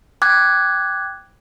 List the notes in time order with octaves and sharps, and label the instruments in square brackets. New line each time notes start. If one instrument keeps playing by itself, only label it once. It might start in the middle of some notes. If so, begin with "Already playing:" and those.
[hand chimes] G5 D6 F#6 G#6